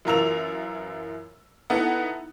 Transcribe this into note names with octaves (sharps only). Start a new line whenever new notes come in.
F#2 E3 F4 A#4 E6 F7
B3 D#4 E4 A4 F#5